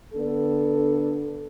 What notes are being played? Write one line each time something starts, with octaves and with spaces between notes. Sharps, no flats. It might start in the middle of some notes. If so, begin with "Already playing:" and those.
D3 B3 D4 A4